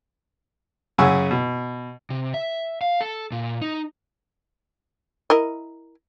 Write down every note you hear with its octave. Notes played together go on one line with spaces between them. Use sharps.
F#2 C#3 F#5 G#5 C#6 E6
B2
C3
E5
F5
A4
A#2
D#4
E4 A#4 D#5